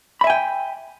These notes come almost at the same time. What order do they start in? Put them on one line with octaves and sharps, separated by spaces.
B5 E5 G#5 G5